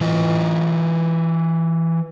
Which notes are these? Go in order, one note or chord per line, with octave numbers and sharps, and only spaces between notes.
E3 F4 D#5